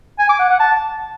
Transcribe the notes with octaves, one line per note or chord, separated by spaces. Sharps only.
G#5
D6
F#5
F#5
A5